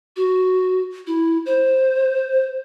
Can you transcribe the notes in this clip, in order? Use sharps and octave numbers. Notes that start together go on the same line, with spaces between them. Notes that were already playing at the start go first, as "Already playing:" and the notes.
F#4
E4
C5